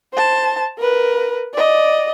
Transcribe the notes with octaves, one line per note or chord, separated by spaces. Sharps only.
C5 A5
A#4 B4
D5 D#5